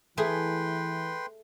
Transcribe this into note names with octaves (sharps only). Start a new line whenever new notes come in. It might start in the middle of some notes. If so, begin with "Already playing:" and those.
E3 A3 G#4 B4 G5 C6